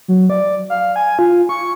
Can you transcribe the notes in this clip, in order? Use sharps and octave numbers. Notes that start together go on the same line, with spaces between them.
F#3
D5
F5
G#5
F4
C#6